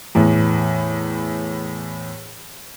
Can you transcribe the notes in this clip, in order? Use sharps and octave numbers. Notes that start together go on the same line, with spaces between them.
E2 A2